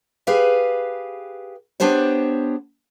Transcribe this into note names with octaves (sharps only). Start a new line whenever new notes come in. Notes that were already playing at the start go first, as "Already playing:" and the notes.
G4 G#4 B4 F5
B3 D4 G4 C5 C#5